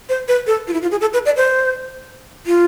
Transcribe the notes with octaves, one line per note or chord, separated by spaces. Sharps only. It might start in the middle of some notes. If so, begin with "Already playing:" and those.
C5
B4
A4
F4
E4
F4
G#4
A4
B4
D5
C5
F4